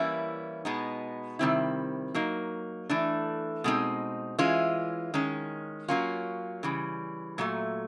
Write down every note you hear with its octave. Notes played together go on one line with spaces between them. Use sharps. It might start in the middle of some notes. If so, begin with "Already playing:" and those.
Already playing: E3 G3 A#3 C#4 E4
B2 G#3 B3 D#4
C3 D#3 G3 C4 E4
F#3 A#3 D#4
E3 A3 D4
B2 G#3 C4 D#4
E3 G#3 C#4 F4
D#3 G#3 C#4
F#3 A#3 C#4 F4
C#3 E3 G3
A#2 F#3 A3